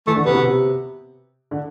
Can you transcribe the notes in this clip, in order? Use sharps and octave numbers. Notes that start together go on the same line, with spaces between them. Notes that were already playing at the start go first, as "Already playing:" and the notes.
E3 A3
D3
C3 B3
B2
C3
D3